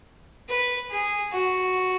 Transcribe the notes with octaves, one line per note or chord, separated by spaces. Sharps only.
B4
G#4
F#4